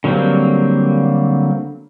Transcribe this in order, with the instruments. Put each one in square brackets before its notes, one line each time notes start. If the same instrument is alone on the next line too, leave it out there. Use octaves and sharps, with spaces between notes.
[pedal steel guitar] D3 F#3 G3 A#3 C4